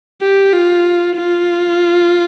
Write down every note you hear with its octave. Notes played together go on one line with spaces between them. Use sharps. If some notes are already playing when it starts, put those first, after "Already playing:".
G4
F4
F4